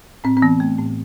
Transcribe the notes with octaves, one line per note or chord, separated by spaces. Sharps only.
A2 C4
C4
E3 B3
A3
A2